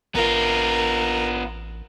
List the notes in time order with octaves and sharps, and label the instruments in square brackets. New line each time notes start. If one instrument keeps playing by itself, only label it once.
[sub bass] A1 [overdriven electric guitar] B3 F4 [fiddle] A#4